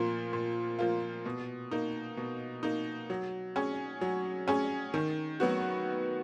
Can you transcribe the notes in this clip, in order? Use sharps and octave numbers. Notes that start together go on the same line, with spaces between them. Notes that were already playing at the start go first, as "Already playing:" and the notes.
Already playing: A#2 F3 A#3 F4
A#2
F3 A#3 F4
B2
A#3 D#4
B2
A#3 D#4
F#3
C#4 G#4
F#3
C#4 G#4
D#3
F#3 B3 F#4